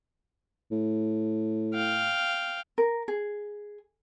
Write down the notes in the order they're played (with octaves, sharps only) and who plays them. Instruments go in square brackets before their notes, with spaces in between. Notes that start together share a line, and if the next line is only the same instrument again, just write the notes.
[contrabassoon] A2
[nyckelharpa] F5 G5
[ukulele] A#4
G#4